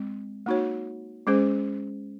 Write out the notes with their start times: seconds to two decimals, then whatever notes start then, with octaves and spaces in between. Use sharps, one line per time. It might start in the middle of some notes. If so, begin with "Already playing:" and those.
Already playing: G#3 C4
0.46 A#3 D#4 F#4 C#5
1.27 G#3 C#4 G#4 C5